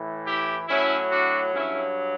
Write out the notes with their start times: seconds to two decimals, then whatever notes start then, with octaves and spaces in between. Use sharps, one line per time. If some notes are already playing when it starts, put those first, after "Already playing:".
Already playing: A2 E3
0.26 E4 G4
0.68 A2 F#3 C#4 E4
1.11 D4 F#4
1.54 G2 F#3 C#4 E4